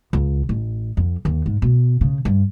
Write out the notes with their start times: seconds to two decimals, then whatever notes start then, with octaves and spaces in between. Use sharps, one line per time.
0.13 C#2
0.49 A1
0.97 F2
1.25 D#2
1.46 G#2
1.62 B2
2.01 C#3
2.25 G2